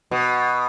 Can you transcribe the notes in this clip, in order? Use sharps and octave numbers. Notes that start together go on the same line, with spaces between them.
B2